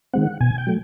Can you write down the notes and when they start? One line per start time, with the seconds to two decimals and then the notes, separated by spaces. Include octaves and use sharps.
0.13 D#3 G#3 C4 F#5
0.40 B2 G#5
0.58 G5
0.67 F#3 A3